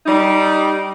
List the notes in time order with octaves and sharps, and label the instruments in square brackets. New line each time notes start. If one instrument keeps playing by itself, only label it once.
[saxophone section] G3 D#4